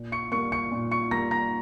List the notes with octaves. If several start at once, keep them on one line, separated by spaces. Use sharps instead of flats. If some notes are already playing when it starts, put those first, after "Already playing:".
Already playing: A#2
C#6 C#7
G3 A#3 C#6 C#7
C#6 C#7
A#2
C#6 C#7
G3 A#3 A#5 A#6
A#5 A#6